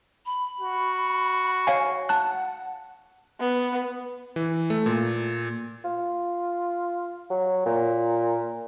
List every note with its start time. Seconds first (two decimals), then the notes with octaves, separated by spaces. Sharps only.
0.26 B5
0.60 F#4
1.67 C#5 F5 G#5
2.09 F#5 A5 F#6
3.40 B3
4.36 E3
4.70 A3
4.86 A#2
5.85 F4
7.30 F#3
7.66 A#2